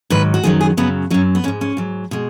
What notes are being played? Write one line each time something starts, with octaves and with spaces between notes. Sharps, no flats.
G#2 D#3 F#3 B4
F#4
F#2 D#3 F#3 G#4
G#4
F#2 C#3 F#3 B3
F#2 F#3 C#4
B3
G#2 G#3 C#4
C#4
G#2 F#3
B2 G#3